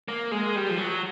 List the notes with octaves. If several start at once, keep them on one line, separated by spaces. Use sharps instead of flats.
A#3
G#3
G3
F3
F#3